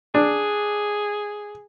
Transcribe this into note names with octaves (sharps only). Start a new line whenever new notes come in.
D4 G#4